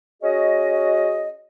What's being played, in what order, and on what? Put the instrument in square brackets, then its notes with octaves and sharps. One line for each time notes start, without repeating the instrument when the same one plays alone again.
[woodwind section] C#4 F#4 G#4 D#5